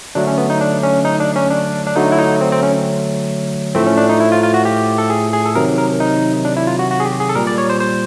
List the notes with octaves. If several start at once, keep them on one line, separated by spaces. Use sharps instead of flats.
D3 F#3 A3 D4
C#4
B3
D#4
D4
C#4
D#4
D4
C#4
D4
D4
D3 F#3 A3 D#4
E4
D#4
C4
C4
C#4
A2 F3 A3 C4
C#4
D4
D#4
E4
F4
F4
F#4
G4
A4
G#4
G#4
A4
C3 D#3 F#3 A#4
A#4
D#4
D4
E4
F4
F#4
F#4
G#4
G4
G#4
A4
A#2 G3 A#4
D5
C#5
C5
C5